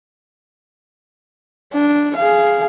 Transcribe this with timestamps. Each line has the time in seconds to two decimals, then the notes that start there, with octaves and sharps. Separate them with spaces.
1.74 D4
2.17 G#4 F5